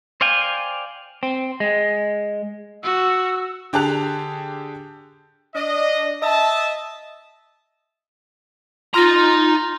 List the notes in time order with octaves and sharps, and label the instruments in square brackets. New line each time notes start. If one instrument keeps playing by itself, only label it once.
[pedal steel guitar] C5 D5 F5 G5 G#5
[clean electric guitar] C4
G#3
[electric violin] F#4 [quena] E6
[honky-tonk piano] D3 G4 G#4 A5 F#6 F7
[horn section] D4 D#5
D#5 E5 A5
[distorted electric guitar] D#4 A#5 [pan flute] F4 [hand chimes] C6 F6 A#6